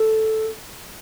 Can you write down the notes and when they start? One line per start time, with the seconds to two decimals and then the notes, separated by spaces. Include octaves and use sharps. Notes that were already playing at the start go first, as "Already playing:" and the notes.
Already playing: A4